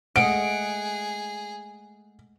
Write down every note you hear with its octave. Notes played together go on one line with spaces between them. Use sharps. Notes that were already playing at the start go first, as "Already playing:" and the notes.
G#3 A3 G#4 D#5 F#5 D7